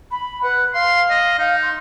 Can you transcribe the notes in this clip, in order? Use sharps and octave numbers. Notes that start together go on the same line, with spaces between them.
B5
B4 F#5
F5 C6
D#5
D#4 F5
C6